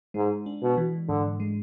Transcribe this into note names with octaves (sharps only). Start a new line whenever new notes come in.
G#2 G#3
D4
B2
E3
G#2 D3
G#3